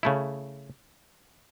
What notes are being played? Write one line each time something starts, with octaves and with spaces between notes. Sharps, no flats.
C#3 A3 E4